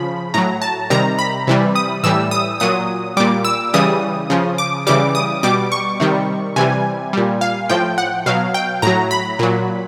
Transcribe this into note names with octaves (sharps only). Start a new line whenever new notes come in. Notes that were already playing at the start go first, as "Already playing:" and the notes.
Already playing: C#3 F3 B5
A2 F#3 A#5
A5
C3 D#3 G3 A#5
B5
C3 E3 G3
D#6
A2 E3 G3 E6
D#6
A#2 F#3 D#6
A#2 G3 D6
E6
C#3 E3 G3 D#6
C#3 F3
D6
C#3 E3 G3 D6
D#6
B2 G3 D6
C#6
C3 D#3 G3
C3 E3 G3 G#5
A#2 G3
F5
A2 F3 G5
F#5
B2 F#3 F5
G5
A2 F#3 A#5
B5
A#2 F#3